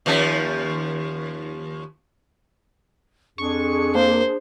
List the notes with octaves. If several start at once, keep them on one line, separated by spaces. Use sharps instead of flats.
D#2 F3 C#4
F2 D4 G#4 C#6
A#3 C5